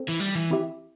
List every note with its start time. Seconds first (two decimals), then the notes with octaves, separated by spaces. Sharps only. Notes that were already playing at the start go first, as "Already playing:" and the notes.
Already playing: C4 A4 C5
0.08 E3
0.20 G3
0.35 E3
0.50 C4 E4 G4 E5